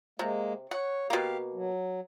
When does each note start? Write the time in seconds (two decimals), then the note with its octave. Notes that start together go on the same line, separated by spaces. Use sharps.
0.19 C3 G#3 A#3
0.71 C#5 F#5
1.10 B2 A#3 G4 F5
1.54 F#3